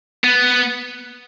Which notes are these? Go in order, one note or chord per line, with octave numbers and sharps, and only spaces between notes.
B3